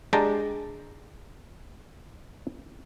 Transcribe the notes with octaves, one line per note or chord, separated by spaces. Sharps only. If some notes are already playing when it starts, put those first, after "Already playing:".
G#3 D4 G4 G5 A5 A#5